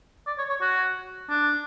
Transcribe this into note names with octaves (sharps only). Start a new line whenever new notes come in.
D5
C#5
C#5
F#4
D4